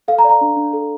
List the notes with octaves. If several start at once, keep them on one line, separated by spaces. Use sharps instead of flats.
A4 F5
A#5
D5
A#5
D4
D4
A4